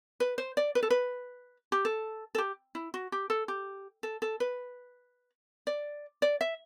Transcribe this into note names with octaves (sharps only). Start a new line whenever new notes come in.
B4
C5
D5
B4
A4
B4
G4
A4
A4
G4
E4
F#4
G4
A4
G4
A4
A4
B4
D5
D5
E5